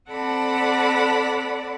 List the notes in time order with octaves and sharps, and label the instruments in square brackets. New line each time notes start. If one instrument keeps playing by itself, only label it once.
[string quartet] C4 A4 D5 F#5 A5 B5